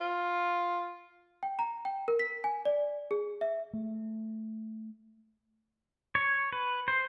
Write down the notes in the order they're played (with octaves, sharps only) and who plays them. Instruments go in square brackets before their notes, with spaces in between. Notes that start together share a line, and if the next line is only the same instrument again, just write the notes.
[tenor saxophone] F4
[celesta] G5
A#5
G5
A#4
B6
G#5
D5
G#4
E5
[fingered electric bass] A3
[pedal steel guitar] C#5
B4
C5